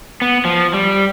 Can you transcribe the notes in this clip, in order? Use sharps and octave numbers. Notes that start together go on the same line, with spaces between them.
B3
F3
G3